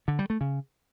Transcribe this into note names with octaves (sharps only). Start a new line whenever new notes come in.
D3
G3
A3
C#3